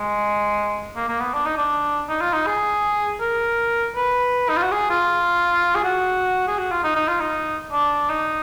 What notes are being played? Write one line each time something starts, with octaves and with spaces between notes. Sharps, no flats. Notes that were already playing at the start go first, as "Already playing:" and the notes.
Already playing: G#3
A#3
A#3
B3
D4
D#4
D4
D#4
F4
D#4
G#4
A#4
B4
D#4
F4
F#4
G#4
F4
G#4
F#4
G#4
F#4
F4
D#4
D#4
F4
D#4
D4
D#4